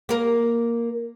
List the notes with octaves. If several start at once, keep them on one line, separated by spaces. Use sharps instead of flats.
A#3 A#4